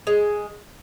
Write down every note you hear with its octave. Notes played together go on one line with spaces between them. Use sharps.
G#3